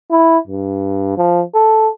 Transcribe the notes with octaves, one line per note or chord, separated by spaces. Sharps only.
E4
G2
F3
A4